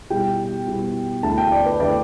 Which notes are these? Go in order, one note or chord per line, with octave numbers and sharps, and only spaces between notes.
B2 G3 B3 E4 G5
B2 G3 B3 E4
D2 D3 A3 E4 A5
G5
D5
B4
D3 A3 E4 D5